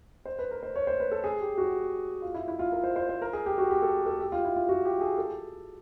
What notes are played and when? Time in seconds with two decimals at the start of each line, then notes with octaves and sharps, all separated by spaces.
0.25 C5
0.39 B4
0.51 A#4
0.63 C5
0.76 C#5
0.87 C5
1.00 B4
1.12 A4
1.24 G#4
1.41 G4
1.58 F#4
2.22 F4
2.34 E4
2.48 E4
2.59 F4
2.72 A#4
2.84 C5
2.96 C5
3.09 C5
3.22 A#4
3.33 G#4
3.46 G4
3.58 F#4
3.71 G4
3.82 A4
4.06 A4
4.20 G4
4.32 F4
4.45 E4
4.56 F4
4.69 F#4
4.85 G4
5.01 G#4
5.18 A4